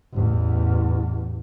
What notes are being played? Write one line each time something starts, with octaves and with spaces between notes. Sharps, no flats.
A1 E2